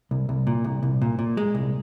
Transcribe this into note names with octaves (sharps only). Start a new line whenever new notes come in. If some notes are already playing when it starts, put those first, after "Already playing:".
C2
C2
A#2
C2
C2
A#2
A#2
G#3
C2